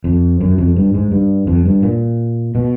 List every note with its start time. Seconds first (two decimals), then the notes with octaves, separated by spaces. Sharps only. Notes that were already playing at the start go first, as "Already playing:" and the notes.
0.04 F2
0.40 F#2
0.58 F2
0.76 G2
0.94 G#2
1.11 G2
1.47 F2
1.66 G2
1.83 A#2
2.55 B2